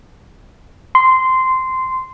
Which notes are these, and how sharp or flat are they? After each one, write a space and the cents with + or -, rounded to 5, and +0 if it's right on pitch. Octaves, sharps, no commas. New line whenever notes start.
C6 -15